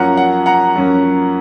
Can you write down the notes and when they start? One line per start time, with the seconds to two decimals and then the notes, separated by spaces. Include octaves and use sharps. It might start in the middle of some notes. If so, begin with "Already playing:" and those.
Already playing: F#2 F3 A#3 C#4 F#5 A#5
0.17 F#5
0.46 F#5 A#5
0.76 F#2 F3 A#3 C#4